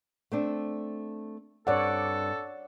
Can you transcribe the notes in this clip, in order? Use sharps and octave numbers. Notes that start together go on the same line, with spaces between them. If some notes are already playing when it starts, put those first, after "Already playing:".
A3 C4 D4
G2 C4 A4 C#5 D5 F#5